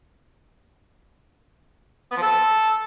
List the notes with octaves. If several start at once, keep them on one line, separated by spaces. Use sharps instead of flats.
B3
F3
A4